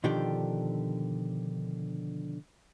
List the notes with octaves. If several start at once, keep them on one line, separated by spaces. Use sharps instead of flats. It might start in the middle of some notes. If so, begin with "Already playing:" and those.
B2 D3 D#3 F3 D4 G4